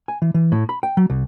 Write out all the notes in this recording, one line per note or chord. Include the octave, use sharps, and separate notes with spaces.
G#5
E3
E3
A2
B5
G5
F#3
C2